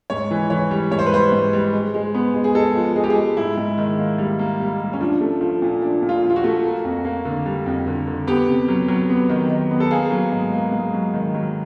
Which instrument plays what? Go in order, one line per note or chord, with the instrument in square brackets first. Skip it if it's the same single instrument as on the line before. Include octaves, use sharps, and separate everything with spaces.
[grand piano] G#2 C#5
E3
E3 C#5
G3
G#2 C#5
C5
B4
G3 C5
G#2
G3
G#3
G#3
B3
G#3
G#4
G#3 A4
F3
G#3 G#4
G4
G#4
G#3
G#2 E4
G#2
D#3
A#3
G3
A#3
G3
G3
C#4
F3 D4
A3
F3
A#2
F3 D4
A#2
F4
F3
F4
F#4
A3
A#3
F2
A#3
D3
G3
F2
D3
D3
B3 G4
C3
F#3
F#3
B3
D#3
D#3
B3
A4
A#3 G#4
F#3
G#2
A#3
G#2
F#3
D#3
F#3